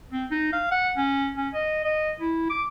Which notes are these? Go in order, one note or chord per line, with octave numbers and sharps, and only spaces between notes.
C4
D#4
F5
F#5
C#4
C#4
D#5
D#5
E4
D6